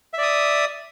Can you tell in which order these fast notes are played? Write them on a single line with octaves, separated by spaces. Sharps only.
E5 D5 D#6